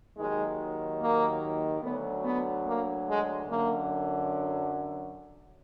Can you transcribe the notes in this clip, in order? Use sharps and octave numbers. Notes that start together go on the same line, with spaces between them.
D#2 D#3 F#3 G#3
A#3
D2 D3 F#3 B3
B3
A#3
G#3
F#2 D3 F#3 A#3